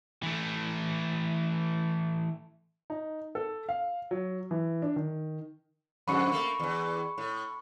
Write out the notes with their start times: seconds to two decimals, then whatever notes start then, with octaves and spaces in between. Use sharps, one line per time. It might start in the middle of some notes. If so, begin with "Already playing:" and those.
0.23 E3 A3
2.90 D#4
3.35 A4
3.69 F5
4.11 F#3
4.51 E3
4.82 D4
4.96 D#3
6.08 F2 G#2 D3 B5 C#6 C#7
6.32 A3 A#3
6.60 E2 E3
7.18 A2